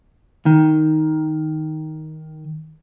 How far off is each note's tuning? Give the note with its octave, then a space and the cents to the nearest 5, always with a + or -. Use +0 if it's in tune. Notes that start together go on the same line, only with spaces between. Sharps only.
D#3 +5